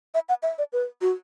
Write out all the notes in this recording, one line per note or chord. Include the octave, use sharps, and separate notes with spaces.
E5
F#5
E5
D5
B4
F#4